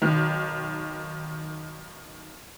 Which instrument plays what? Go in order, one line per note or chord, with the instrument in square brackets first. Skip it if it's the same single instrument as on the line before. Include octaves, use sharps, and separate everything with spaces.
[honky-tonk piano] B1 D#3